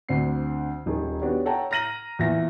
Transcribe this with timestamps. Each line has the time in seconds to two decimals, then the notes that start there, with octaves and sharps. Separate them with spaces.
0.09 D2 D3 C4 D4 C7
0.86 D#1 D#3 G#4
1.21 B3 D4 F#4 G4 C#5
1.45 A4 C#5 F#5 G5 A5 A#5
1.71 A#5 F6 A#6 D#7 F#7
2.19 E2 A#2 E4 E5 A#6